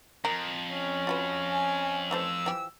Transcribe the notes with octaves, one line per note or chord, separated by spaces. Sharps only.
F2 A#4
C#4
F4 F#4 B4
G#5
E3 A3 C5 E6
E3 F3 G4